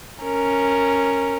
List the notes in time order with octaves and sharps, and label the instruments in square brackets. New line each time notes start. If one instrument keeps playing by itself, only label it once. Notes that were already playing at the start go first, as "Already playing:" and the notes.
[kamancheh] C#4 A#4